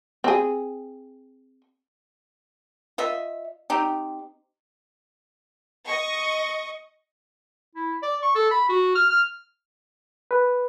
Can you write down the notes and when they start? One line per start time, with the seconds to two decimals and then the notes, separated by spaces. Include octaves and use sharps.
0.24 C4 G#4
2.98 F4 D#5 E5
3.70 C4 D#4 G4
5.86 D#5 C#6
7.75 E4
8.03 D5
8.23 C#6
8.35 A4
8.51 B5
8.69 F#4
8.95 F6
9.10 F6
10.31 B4